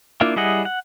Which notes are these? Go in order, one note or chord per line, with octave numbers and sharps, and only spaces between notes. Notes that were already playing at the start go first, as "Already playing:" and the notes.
A#3 D4 E4 F4
G3 E4 G#4 D#5 F#5
F#5